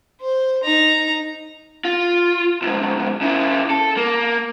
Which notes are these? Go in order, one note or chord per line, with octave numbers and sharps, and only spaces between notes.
C5
D#4 A#5
F4
D2 G#2
C#3 E4
A4
A#3